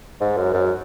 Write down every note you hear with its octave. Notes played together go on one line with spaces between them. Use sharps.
G#2
F#2
F#2